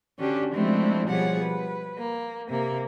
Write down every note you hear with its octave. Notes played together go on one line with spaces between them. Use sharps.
D3 C#4 D4 F#4 G4
F3 G#3 A3 C4 D4 E4
B2 F3 G3 G#4 C#5 F#5
B4
A#3
C3 A#3